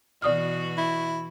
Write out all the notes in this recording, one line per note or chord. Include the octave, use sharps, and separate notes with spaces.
B2 E3 F#4 D5 D#6 F6
E4